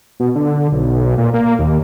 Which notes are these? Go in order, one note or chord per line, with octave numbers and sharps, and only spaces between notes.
B2
D3
B1
A#2
A#3
D#2